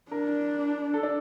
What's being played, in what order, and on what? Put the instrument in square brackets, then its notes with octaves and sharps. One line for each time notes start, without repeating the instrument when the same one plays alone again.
[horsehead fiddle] D4 [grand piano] A#4
[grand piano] A4
D4